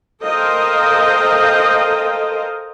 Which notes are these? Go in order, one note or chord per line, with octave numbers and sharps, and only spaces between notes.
A4 A#4 C5 D#5 F5 G5